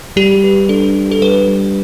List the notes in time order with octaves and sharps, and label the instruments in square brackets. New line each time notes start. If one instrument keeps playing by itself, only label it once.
[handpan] G3 [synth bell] G4
[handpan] B4
[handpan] D4 [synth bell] A4
[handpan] G4
[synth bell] A4
[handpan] G3 [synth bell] B4
[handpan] G3